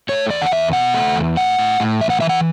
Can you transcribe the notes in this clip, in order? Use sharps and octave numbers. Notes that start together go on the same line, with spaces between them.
A3 C#5
E2 D5
F#5
E2 E5
B2 F#5
A3
E2
A2 F#5
A2
A2
E3 E5
F#5
E3 E5
F#5